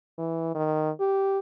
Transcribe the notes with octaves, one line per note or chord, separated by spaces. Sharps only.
E3
D#3
G4